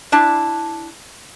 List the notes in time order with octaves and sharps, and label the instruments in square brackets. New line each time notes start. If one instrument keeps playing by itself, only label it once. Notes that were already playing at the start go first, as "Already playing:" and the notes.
[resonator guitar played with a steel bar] D4 E4 A5